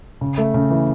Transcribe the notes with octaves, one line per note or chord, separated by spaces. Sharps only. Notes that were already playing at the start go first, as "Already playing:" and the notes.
C#3
A3
C#3
E3